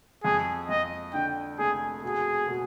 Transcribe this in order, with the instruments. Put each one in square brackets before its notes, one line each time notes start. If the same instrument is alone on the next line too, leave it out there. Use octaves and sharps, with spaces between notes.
[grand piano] F2 [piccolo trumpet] G#4
[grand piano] F2 [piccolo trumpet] D#5
[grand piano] D3 [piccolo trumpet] G5
[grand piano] F1 [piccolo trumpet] G#4
[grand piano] B2 [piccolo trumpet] G#4
[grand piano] B2